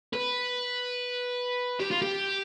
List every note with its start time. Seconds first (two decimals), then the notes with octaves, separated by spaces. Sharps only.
0.13 B4
1.80 G4
1.91 F4
2.02 G4